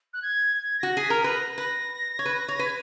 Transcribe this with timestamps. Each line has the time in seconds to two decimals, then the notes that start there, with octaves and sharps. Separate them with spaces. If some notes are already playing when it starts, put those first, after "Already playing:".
0.14 F#6
0.22 G#6
0.57 G#6
0.80 F#4 A#6
0.97 G#4
1.02 B6
1.10 A#4
1.24 B4 A#6
1.58 B4
2.19 C#5
2.25 B4
2.48 C#5
2.59 B4
2.65 G#6